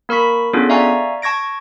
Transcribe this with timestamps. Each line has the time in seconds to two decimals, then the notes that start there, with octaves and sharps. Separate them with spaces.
0.09 A#3 A#4 B5 C#6 B6
0.53 B3 C#4 D4 F4 G#4 A4
0.69 D5 E5 F5 G#5 A#5 C#6
1.22 A5 C#6 G#6 A#6 D7